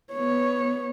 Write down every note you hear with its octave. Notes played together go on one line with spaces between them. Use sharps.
B3 C#5